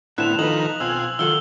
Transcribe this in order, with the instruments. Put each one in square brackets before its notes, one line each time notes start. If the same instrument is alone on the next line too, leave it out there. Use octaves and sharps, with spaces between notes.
[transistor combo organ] A2 B3 C4 [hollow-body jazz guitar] D3 E4 [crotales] F#6 E7 F7
[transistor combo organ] D#3 F3 D#4 [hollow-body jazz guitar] A4 B4 [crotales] F#7
[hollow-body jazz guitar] B1 [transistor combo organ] C4 F4 G#5 [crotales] E6
[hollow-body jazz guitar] D#3 F#3 A4 [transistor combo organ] F4 [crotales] E6 G7